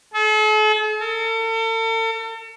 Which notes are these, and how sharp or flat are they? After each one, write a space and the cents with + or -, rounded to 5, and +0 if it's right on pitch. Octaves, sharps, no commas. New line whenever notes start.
A4 -45
A4 +40